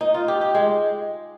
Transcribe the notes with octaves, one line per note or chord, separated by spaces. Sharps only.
D#4
F4
G4
G4
G#3